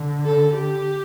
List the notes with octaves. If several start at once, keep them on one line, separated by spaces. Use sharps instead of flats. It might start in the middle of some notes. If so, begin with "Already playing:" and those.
Already playing: D3
A4
G4